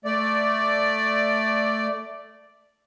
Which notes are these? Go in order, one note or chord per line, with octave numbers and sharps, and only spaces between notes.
A3 D5